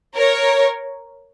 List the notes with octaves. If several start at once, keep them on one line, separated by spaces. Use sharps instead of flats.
A#4 C#5